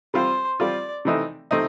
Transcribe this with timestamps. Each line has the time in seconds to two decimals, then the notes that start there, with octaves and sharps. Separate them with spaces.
0.14 G3 C4 F4 C5
0.59 G3 C4 F4 D5
1.05 C3 E3 A3 C4 D#4
1.51 C3 A3 C4 D#4